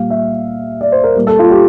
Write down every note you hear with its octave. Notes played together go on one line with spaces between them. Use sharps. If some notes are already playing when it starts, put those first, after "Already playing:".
Already playing: A#2 G3 F5
E5
D5
C5
A#4
A#2 G3
A4
F4
G4